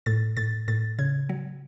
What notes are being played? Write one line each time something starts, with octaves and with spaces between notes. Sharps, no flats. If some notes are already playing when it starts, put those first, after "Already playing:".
A2 A6
A2 A6
A2 A6
C#3 G#6
F#3